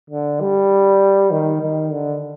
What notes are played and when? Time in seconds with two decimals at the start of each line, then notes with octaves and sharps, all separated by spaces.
0.10 D3
0.40 G3
1.31 D#3
1.62 D#3
1.92 D3